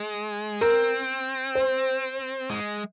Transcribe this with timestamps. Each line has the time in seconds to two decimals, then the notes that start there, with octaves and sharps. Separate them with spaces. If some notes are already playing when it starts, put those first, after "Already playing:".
Already playing: G#3
0.61 C4 A#4
1.55 C5
2.50 G#3